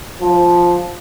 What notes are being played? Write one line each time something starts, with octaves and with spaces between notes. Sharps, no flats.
F3